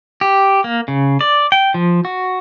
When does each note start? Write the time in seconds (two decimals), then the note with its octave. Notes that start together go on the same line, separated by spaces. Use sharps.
0.21 G4
0.64 A#3
0.88 C#3
1.21 D5
1.52 G5
1.74 F3
2.05 F#4